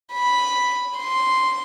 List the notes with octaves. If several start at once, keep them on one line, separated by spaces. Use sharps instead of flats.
B5
C6